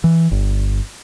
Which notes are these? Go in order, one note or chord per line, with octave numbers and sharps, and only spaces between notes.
E3
G1